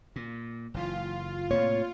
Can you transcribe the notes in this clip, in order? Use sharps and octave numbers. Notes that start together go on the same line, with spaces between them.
A#2
F#1 E3 F4
A2 C3 A#3 C#5